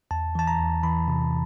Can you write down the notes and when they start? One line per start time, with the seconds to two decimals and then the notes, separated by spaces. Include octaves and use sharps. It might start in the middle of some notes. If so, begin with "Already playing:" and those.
0.11 E2 A5
0.35 E3 A5
0.47 A#5
0.59 E2
0.83 E3 B5
1.08 C3